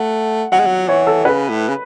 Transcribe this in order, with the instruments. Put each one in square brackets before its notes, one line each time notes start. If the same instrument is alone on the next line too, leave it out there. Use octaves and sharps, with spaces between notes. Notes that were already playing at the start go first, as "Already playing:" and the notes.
Already playing: [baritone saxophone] A3 [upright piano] F#5
[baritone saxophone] F#3 [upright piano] F#5
[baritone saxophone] G#3
F#3
[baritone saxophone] E3 [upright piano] C#5
[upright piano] A4
[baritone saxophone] C#3 [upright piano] B4
[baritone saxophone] A2
C#3